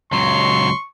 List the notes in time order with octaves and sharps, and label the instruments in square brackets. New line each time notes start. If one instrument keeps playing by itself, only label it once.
[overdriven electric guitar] C#2 F#3 [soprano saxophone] C6 [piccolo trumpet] C#6